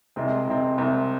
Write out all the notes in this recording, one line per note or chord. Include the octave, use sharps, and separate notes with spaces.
C2 C3 G#3 C4
C2 C3 G#3 C4
C2 C3 G#3 C4